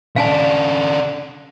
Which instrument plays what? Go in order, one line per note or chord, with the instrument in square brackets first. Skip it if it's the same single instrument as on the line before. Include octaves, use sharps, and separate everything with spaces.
[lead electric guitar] C#3 D4 [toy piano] F5 G#5 A5